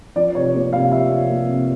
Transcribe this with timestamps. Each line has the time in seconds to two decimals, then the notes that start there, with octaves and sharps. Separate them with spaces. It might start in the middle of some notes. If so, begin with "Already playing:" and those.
0.16 F3 D5
0.35 C3 C#5
0.54 A#3
0.73 C3 F5
0.91 F3 E5
1.11 C3
1.30 A#3
1.48 C3